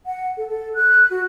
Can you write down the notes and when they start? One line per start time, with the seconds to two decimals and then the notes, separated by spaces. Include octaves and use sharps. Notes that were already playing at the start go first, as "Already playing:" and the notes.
0.06 F#5
0.37 A4
0.49 A4
0.75 F#6
1.10 F#4